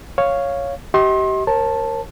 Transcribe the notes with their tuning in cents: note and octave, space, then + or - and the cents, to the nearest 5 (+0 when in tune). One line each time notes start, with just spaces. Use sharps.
C#5 +0 F5 +0
G4 -30 D#5 +40 C6 +30
A#4 +0 C#5 -45 A5 +0